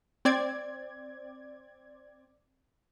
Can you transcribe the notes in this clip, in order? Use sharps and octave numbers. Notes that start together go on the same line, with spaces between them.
C4 D5 G#6